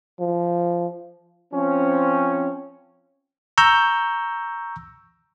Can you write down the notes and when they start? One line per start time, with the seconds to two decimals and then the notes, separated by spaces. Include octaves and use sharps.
0.20 F3
1.53 F3 C4 C#4
3.58 A#5 C#6 E6 G6